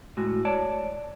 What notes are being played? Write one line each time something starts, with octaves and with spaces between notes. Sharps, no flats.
A2 G#3 F#4
C#5 D5 A5